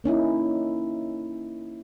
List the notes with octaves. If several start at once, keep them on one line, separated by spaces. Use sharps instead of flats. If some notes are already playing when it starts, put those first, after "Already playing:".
A#3 C#4 D#4 E4